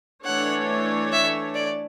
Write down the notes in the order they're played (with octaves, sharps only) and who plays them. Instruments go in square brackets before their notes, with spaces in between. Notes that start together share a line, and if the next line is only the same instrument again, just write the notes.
[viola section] E3 A3 D4 A4 C#5 [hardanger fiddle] F#5
[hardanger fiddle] E5
D5